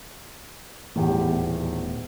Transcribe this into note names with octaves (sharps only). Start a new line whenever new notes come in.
D#1 E2 A2 G4